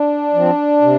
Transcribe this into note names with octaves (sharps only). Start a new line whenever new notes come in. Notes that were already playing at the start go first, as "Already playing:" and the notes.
Already playing: D4
F3 C4
C3